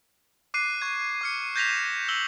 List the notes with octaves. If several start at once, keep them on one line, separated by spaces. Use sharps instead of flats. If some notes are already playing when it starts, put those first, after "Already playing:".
D6 F#6 C7 D#7
C#6 G#6
D6 F6 C#7
G6 G#6 A#6 B6 E7 F7
E6 F#7 G7